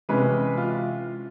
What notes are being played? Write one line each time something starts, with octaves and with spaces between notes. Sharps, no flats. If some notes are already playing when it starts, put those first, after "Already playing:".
C3 E3 G#3 C#4 B4
F4